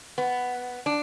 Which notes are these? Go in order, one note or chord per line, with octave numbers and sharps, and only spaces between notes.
B3
D4